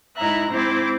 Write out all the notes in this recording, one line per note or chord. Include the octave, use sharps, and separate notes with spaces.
G#2 D#4 E4 E5 A#5 F#6
G#2 C4 E4 C5 D6